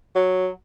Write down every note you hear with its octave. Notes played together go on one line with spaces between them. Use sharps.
F#3